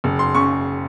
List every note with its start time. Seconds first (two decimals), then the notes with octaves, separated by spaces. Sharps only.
0.04 F#1
0.19 C6
0.35 C#3 C#6